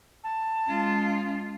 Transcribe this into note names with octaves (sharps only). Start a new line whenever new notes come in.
A5
G#3 C#4 F4